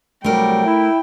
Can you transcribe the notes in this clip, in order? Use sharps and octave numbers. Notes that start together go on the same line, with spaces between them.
C2 F#3 G3 A3 A#4 G5
E4